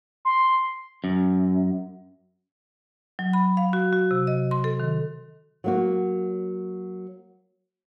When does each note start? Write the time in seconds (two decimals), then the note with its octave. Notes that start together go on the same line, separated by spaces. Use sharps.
0.25 C6
1.04 F#2
3.19 F#3
3.33 B5
3.57 F5
3.73 F#4
3.93 F#4
4.11 C3
4.27 D#5
4.51 C6
4.64 A4
4.80 D#3
5.64 F#3 A#3 F#4